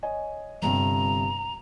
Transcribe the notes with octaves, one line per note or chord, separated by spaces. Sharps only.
C#5 D#5 G#5
G1 G2 C3 A#5